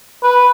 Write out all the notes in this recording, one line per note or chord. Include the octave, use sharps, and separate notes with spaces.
B4